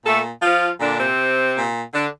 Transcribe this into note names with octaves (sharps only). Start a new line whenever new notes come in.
A#2 A3 A4
F3 F4
A#2 D3 D4
C3 C4
A#2
D3 D4